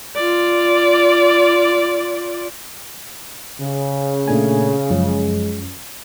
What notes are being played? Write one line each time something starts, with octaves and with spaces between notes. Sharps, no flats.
F4 D5
C#3
A#2 A3 D4 G#5
F#2 F3 G#3 C#4